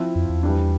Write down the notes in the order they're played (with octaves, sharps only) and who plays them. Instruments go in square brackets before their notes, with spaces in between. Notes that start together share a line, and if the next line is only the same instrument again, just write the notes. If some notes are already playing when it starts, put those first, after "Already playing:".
Already playing: [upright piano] F3 C4 E4
[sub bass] F2
E2
[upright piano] E3 G3 D4